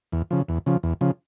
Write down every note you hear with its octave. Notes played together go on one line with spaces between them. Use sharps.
E2
C#3 F3
E2
C#3 F3
E2
C#3 F3